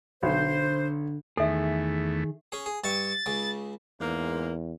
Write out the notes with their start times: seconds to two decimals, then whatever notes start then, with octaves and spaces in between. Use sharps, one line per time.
0.23 B1 D3 C5
1.37 E2 D#3 A3 G#4 A4 E5
2.52 C#4 G#4
2.66 G#4
2.84 G2 E5 C#6 A6
3.26 C#2 C#3
4.00 E2 G#2 A#3